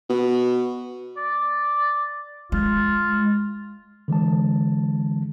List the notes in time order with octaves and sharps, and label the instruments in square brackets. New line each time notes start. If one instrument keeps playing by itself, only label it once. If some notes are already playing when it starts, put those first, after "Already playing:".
[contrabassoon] B2
[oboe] D5
[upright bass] G#3 [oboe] F4
[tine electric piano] D3 E3 G#3 A5